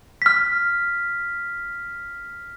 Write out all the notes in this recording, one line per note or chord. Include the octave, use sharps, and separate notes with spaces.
F6 B6